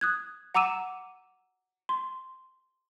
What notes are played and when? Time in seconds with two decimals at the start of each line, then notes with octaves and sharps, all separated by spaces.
0.01 D#6 F#6 G#6
0.55 F#5 A#5 D6 E6 D#7 E7
1.89 C6